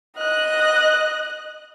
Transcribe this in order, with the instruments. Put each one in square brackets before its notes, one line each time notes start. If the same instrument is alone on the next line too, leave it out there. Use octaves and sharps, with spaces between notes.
[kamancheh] D#5 F#6